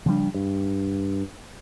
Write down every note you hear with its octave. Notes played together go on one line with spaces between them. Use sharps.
C#3 F3 G3 D4
G2